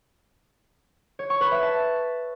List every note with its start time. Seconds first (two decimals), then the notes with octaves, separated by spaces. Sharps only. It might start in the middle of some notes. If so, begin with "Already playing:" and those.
1.19 C#5
1.30 C#6
1.41 B4
1.52 E5
1.63 A5